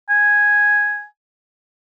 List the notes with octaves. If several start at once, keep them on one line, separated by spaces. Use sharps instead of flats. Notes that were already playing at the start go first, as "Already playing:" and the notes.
G#5